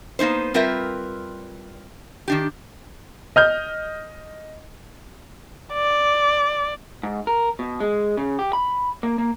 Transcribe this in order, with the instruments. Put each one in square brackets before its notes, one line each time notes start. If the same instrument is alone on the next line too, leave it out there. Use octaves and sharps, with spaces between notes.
[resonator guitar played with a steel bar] A#3 B3 D#4 C5
G3 C4 F4 A#4 B4 E5
D#3 D4 G4
[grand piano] D#5 F6 G6
[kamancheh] D5
[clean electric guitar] G#2
A#4
B2
G#3
C#3
G4
B5
A#3
A#3